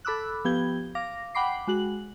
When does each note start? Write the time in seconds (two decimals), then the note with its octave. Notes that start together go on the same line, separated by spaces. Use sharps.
0.05 A4 B5 D6 E6 F#6
0.45 F3 B3 G4 G#6 G7
0.95 F5 D6 A#6
1.35 F#5 G5 B5 D6 C7
1.67 G#3 F#4 F#7